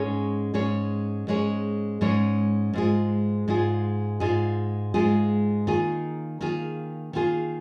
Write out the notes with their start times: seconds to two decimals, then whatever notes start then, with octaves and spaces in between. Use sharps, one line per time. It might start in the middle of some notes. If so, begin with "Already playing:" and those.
Already playing: G#2 G#3 C#4 G#4 C#5
0.54 G#2 G#3 C#4 G#4 C#5
1.27 G#2 G#3 C#4 G#4 C#5
2.01 G#2 G#3 C#4 G#4 C#5
2.73 G#2 G#3 F4 G#4
3.48 G#2 G#3 F4 G#4
4.20 G#2 G#3 F4 G#4
4.94 G#2 G#3 F4 G#4
5.67 D#3 A#3 F4 G#4
6.41 D#3 A#3 F4 G#4
7.13 D#3 A#3 F4 G#4